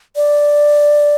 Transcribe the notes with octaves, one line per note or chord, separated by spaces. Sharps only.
D5